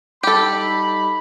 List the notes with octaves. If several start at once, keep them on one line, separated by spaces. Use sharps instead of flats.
G3 D#4 G4 A4 B5